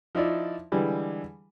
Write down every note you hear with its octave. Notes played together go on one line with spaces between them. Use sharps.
F3 D#4 E4 D5
D3 E3 G3 G#3